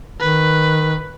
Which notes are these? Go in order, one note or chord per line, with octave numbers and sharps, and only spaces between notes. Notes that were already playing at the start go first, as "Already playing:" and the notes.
D#3 B4